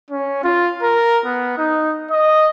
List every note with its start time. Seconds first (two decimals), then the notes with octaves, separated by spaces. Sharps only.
0.10 C#4
0.44 F4
0.83 A#4
1.26 B3
1.58 D#4
2.11 D#5